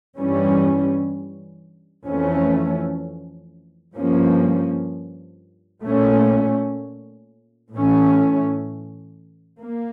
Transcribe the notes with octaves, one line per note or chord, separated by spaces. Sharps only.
G2 E3 G3 C#4
F2 E3 A3 C#4
G2 F3 A#3 C#4
A#2 A3 C#4
A2 E3 A3 C#4
A#3